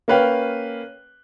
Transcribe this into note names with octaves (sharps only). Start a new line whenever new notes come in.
A#3 C#4 B4 F5 G5